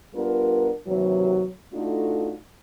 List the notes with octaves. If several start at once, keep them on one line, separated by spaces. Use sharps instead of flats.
G3 B3 D4 F4 A#4
D#2 C3 E3 F#3
A3 D4 D#4 F4 F#4 A4